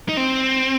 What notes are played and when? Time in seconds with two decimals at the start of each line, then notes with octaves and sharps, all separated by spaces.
0.09 D#4
0.17 C4